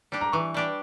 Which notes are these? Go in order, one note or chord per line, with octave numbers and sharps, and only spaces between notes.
G3 D4 G4
A#5
E3 C#6
G3 D4 G4